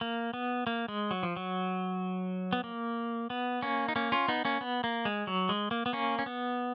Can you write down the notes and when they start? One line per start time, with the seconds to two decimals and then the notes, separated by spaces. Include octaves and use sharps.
0.01 A#3
0.34 B3
0.67 A#3
0.88 G#3
1.11 F#3
1.23 F3
1.36 F#3
2.53 B3
2.64 A#3
3.30 B3
3.62 A#3 C#4
3.88 D#4
3.96 A#3 C#4
4.12 C#4 F4
4.28 B3 D#4
4.45 A#3 C#4
4.61 B3
4.84 A#3
5.05 G#3
5.27 F#3
5.49 G#3
5.71 A#3
5.86 B3
5.93 A#3 C#4
6.19 C#4
6.26 B3